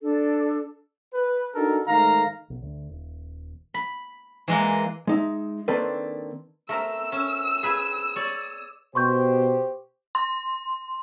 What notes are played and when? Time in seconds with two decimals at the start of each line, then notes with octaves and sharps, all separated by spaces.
0.02 D4 A4
1.14 B4
1.55 D4 D#4 F#4 A4 A#4
1.87 G#2 D#3 A3 F5 A#5
2.50 B1
2.62 D2
2.89 D#1
3.74 B5
4.48 E3 G#3 A#3
5.07 G#3 D#4 E5
5.68 D#3 A#3 C4 D4 A4 B4
6.69 A3 A#4 E6
7.12 C#4
7.63 G#4 B4 G#5
8.16 C#5 D5
8.95 B2 G4 C5 C6 C#6 G6
10.15 C6